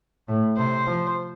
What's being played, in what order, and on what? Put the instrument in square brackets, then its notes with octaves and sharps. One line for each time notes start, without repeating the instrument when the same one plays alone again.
[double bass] A2
[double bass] C3 [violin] C5
[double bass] F3